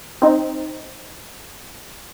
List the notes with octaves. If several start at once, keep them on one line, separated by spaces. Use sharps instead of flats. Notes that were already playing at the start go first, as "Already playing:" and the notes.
C4 D#4